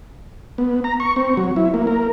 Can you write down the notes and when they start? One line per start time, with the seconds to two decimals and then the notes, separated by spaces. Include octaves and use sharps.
0.58 B3
0.84 A#5
1.00 C#6
1.16 C4
1.37 F#3
1.56 E4
1.74 A#3
1.87 A#4